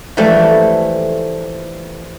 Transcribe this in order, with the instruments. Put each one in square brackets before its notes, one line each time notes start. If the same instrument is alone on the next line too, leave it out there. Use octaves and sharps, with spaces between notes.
[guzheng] E3 F3 G3 A3